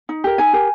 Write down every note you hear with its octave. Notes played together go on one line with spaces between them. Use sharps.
D#4
G4 A#4
D#4 G#5
G4 A#4